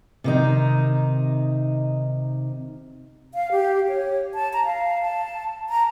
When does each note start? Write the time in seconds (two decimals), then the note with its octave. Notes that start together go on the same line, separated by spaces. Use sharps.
0.24 C3 D#3 D#4
3.34 F5
3.52 G4
3.89 C#5
4.34 A5
4.53 A#5
4.65 F5
5.03 A5
5.69 A#5